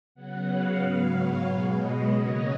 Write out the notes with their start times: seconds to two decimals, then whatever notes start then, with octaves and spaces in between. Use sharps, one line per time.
0.15 C#3 F#3 B3 F#5
0.46 F5
0.79 G#2 F#3 B3 F5
1.12 C#5
1.43 B2 G#3 B3
1.76 D#5
2.08 C#3 F#3 A#3 C#4 D#5